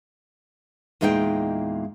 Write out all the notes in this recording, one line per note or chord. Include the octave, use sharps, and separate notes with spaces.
E2 A#2 G#3 D#4 G#4 G5